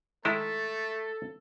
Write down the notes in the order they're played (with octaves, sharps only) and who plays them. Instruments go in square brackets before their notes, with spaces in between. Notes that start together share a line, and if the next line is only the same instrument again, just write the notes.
[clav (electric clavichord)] D#3 G#3 E4 [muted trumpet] A3 [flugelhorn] A4